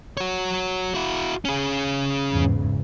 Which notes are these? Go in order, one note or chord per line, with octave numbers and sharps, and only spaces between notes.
F#4 C#5
E4 F#4
C#4 G#4
E2 G#2 C#3